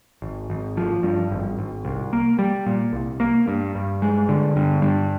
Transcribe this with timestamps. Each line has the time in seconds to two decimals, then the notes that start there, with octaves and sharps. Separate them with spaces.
0.22 G#1
0.50 G#1
0.77 F3
1.03 G2
1.31 G#1
1.59 G#1
1.85 C2
2.13 A#3
2.39 G3
2.66 A#2
2.93 C2
3.20 A#3
3.48 G2
3.75 G2
4.02 G#3
4.29 D3
4.56 G2
4.82 G2